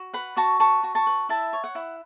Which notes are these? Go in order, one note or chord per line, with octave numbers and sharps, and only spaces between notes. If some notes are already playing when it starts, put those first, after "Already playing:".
Already playing: F#4
B4 F#5 B5
F#4 A5 C#6
B4 A5 C#6
F#4
A5 C#6
B4
E4 E5 A5
C#5
F#5
E4